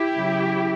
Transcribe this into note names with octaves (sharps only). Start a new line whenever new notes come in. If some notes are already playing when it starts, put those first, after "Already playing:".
Already playing: E4 G4
C#3 F#3